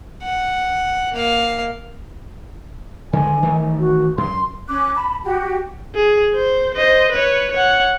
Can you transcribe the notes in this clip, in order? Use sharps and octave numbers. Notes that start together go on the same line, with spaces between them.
F#5
A#3 F5
D3 D#3 G#3 G#5
D#3 E3 A3
F#4
F#2 C6
C#4 D6 F#6
A5 B5
F#4 G4 G5
G#4
C5
C5 D#5
B4 C#5
C#5 F#5